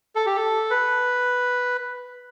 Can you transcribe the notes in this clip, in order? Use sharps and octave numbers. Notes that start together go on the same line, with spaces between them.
A4
G4
A4
B4